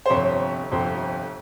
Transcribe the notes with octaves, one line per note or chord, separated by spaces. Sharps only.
C5
G1 F2 C3 C#5
G1 F2 C3 C5